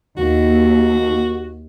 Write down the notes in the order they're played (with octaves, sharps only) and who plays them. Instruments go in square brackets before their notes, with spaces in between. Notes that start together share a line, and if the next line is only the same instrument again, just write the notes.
[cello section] D#2 [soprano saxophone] F#4